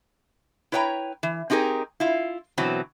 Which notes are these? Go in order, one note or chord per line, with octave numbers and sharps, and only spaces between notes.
E4 B4 C#5 F#5 G5 A#5
E3
C4 D#4 G4 G#4 A#4
E4 F4
B2 E3 F#3 C4